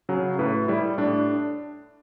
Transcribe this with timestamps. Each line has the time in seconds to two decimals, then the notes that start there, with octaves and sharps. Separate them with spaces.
0.09 C#3 F#3
0.39 A2 B4
0.68 G3 E4
0.98 A2 D4